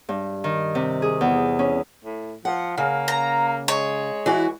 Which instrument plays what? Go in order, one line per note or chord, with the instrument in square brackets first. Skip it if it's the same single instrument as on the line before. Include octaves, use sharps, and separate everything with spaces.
[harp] G2
D#3
C3
G#4
E2
C#4
[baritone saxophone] A2
[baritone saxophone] F3 [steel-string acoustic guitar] F#5
[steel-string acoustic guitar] C#3 [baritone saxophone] A#3
[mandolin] A#5
[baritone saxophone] G#3 [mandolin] C#5
[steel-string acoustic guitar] E3 E4 F#4